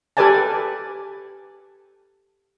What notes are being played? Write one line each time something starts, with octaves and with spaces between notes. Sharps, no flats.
G4 A4 B4 D5 G#5 A5